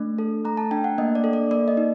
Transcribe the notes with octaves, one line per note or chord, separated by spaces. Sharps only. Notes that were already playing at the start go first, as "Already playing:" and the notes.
Already playing: A3 D4
A4
A3 A#5
A5
D4 G5
F#5
A#3 D#5
D5
A4
D5
A#3 D5
D#5
D#4